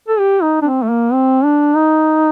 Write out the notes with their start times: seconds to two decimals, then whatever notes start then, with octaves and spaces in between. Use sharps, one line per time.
0.08 A4
0.19 G4
0.42 D#4
0.62 D4
0.65 C4
0.83 A3
0.89 A#3
1.13 C4
1.44 D4
1.76 D#4